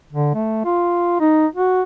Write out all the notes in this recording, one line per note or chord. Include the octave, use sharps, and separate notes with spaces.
D3
A3
F4
D#4
F#4